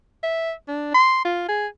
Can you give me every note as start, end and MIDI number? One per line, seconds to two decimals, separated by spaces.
0.23 0.52 76
0.68 0.91 62
0.94 1.22 84
1.25 1.45 65
1.48 1.67 68